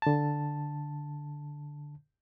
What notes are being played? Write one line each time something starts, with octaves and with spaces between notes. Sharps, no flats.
D3 A5